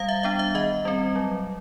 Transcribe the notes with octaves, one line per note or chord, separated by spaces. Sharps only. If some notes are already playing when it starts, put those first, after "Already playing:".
Already playing: G3 F5
E5
B3 D4 E5
E5
D#3 D#5
G3 C4
F#3